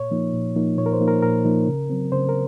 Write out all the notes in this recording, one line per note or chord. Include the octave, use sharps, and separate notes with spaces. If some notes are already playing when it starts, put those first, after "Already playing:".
Already playing: A#2 C#5
F3 A#3 D#4
A#2
F3 A#3 D#4
A#2 C#5
A#4
C5
F3 A#3 D#4
A#4
A#2 A#4
F3 A#3 D#4
C#3
F#3 C4
C#3 C5
A#4